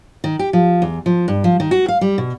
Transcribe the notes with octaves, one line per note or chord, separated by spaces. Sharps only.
D#3
G4
F3
E2
F3
G2
F3
D#3
F#4
F5
G3
B2